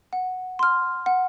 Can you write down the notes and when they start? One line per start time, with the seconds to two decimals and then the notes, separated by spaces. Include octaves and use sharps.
0.13 F#5
0.59 C6 F6
1.06 F#5